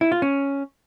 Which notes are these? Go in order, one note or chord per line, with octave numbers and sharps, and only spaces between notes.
E4
F4
C#4